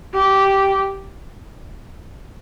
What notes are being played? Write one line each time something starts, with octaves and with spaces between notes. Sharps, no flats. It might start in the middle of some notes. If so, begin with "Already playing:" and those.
G4